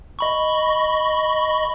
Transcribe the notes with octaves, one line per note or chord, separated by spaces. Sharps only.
D#5 B5 C#6